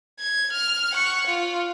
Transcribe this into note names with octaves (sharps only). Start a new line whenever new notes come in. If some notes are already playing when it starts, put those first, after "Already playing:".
G#6
F6
F#5 C#6
F4